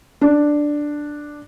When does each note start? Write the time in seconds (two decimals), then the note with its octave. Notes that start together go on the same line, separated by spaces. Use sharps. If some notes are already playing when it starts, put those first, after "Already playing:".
0.21 D4